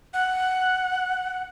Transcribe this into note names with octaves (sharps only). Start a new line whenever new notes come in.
F#5